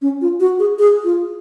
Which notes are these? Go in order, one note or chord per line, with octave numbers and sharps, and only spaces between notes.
C#4
F4
F#4
G#4
G#4
F4